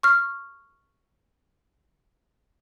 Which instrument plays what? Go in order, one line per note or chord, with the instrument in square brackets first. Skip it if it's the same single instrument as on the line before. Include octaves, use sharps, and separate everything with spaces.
[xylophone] C#6 F6